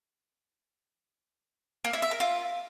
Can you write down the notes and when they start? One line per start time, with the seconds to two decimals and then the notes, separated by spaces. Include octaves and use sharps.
1.84 A#3
1.93 E4
2.02 E5
2.11 A#4
2.20 F4